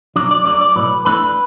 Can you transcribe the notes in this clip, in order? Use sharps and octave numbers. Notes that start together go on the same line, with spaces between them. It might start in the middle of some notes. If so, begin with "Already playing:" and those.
B1 B2 F#3 D4 D5
D5
D2 D3 F#3 D5
D5
B1 A2 F#3 B4
E2 E3 A3 D4 B4